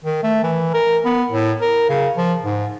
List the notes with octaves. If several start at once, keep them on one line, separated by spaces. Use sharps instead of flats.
D#3
A3
E3
A#4
B3
A2
A#4
C#3
F3
G#2